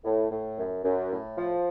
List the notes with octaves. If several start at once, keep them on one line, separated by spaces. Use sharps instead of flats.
A2
A2
F#2
F#2
A2
F3